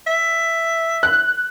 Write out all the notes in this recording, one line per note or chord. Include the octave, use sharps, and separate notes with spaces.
E5
F#6